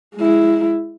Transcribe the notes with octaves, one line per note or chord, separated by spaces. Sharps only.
G#3 E4